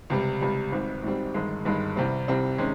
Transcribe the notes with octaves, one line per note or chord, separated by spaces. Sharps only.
C#2 C3 G3
C#2 C3 G3
G#1 G#2 G3 C4
G#1 G#2 G3 C4
G1 G2 D#3 G#3
G1 G2 D#3 G#3
C2 C3 G3 C4
C2 C3 G3 C4
C3 D#3 G#3 C#4